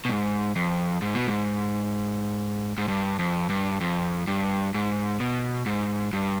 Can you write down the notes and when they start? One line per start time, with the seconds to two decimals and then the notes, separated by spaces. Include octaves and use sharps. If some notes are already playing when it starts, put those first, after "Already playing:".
0.05 B2
0.09 G#2
0.56 F2
1.02 G#2
1.14 B2
1.27 G#2
2.78 G#2
2.88 G2
3.19 F2
3.50 G2
3.81 F2
4.27 G2
4.74 G#2
5.20 B2
5.66 G#2
6.13 G2